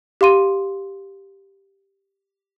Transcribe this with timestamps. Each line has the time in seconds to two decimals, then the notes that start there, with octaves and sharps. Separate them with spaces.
0.21 G4 F5 C6 D#7